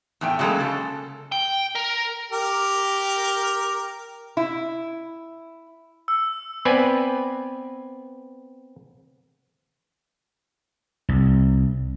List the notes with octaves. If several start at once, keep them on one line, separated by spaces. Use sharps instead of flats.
E2 A2 G5
C#3 F#3 G#3 A#3 A4
C#3 A4
G5
A#4
G4 A#4
E4
E6
B3 C4 B4 D5 G#5
C2